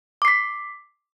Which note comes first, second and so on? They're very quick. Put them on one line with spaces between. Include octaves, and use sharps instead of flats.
D6 C7 B6